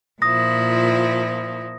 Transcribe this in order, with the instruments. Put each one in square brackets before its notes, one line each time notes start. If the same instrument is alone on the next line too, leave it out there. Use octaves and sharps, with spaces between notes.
[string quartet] A#2 F3 E4 [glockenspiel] D#6 A#6